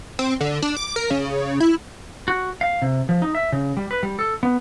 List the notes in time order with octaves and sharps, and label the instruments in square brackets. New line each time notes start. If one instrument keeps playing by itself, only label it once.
[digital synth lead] C4
D3
D4
D6
A#4
C#3
E4
[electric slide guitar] F#4
F5
C3
F3
D#4
E5
C#3
G3
B4
G3
A4
B3